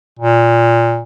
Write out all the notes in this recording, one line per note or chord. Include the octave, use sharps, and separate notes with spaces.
A#2